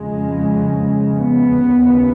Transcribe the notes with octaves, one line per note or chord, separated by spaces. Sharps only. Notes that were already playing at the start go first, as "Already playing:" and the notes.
Already playing: F2 C#3 G#3
B3
D#2 C#3